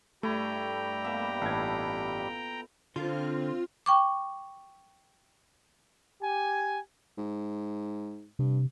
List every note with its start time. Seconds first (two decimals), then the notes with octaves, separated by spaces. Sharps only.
0.23 G2 A3 E4 G4 G5 A#5 B5
1.04 B2 A#3 E5
1.41 A1 F4 A4 B4 G#6
2.96 D3 C4 F4
3.86 G5 C#6 D6
6.22 G4 G#5
7.18 G#2
8.39 G2 C3